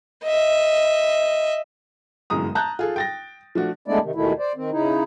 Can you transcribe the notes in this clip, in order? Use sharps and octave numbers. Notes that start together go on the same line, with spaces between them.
D#5 E5
G1 F#2 E3 G#3 A#5 D#6
A5 A#5 F#6 G6
F4 G#4 A4
G5 A6 A#6
F3 A3 D4 F#4
G#3 A3 B3 D4 E4 D5
C3 D#3
D#2 B2 D#3 E3 A3 E4
C5 D5
D#3 C4
C#3 D#4 E4